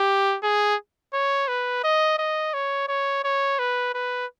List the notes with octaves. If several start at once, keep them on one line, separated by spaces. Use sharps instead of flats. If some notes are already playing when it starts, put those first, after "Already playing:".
Already playing: G4
G#4
C#5
B4
D#5
D#5
C#5
C#5
C#5
B4
B4